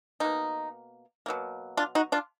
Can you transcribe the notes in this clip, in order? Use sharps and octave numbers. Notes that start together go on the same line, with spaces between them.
B2 A#3 D#4
B2 F#3 A#3
D4 F4
D#4 F#4
D4 F4